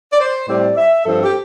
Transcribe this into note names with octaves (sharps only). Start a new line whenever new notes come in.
D5
C5
A2 G3 C4 D5
E5
G2 F3 C4 A4
G4